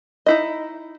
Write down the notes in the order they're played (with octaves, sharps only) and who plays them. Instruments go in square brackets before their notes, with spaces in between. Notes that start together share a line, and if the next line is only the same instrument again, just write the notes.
[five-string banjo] D#4 E4 D#5